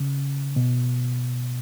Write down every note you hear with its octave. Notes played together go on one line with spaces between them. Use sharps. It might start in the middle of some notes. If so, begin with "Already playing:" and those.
Already playing: C#3
B2